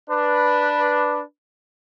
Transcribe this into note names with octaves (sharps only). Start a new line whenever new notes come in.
D4 B4